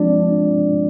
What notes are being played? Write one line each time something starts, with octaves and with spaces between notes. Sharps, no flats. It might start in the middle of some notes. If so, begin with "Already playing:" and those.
Already playing: F3 G#3 C4 D4 F4 D5